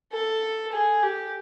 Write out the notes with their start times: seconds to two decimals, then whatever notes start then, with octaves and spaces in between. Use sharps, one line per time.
0.13 A4
0.72 G#4
1.02 G4